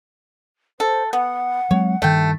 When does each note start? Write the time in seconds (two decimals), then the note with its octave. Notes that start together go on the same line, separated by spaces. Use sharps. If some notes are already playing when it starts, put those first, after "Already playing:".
0.80 A4 C5
1.13 B3 F#5
1.71 F#3 G#3 C4 C#5
2.02 G2 D#3 A3 G5